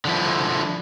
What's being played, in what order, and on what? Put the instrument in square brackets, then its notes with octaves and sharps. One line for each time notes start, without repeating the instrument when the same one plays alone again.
[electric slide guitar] D3 F3 E4